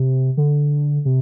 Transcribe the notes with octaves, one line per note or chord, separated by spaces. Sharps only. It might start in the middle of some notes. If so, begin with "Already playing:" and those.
Already playing: C3
D3
C3